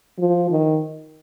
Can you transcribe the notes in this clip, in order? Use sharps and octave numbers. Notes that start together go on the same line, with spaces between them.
F3
D#3